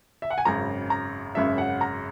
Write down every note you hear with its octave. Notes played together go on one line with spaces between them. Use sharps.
E5
F#5
G#5
G#1 F#2 C#3 A#5
A#5
G#1 F#2 C#3 E5
F#5
A#5